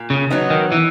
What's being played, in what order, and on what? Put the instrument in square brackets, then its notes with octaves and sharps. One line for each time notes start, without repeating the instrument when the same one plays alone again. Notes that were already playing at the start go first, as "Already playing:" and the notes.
Already playing: [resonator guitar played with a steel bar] A#2
[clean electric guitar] C#3
[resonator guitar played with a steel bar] F#3 B3 D#4
[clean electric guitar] D#3
E3